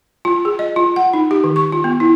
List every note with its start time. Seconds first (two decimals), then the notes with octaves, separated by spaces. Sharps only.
0.25 F4
0.45 G#4
0.59 D#5
0.76 F4
0.96 F#5
1.13 D#4
1.31 G4
1.44 D#3
1.56 C#6
1.72 F4
1.84 B3
2.00 E4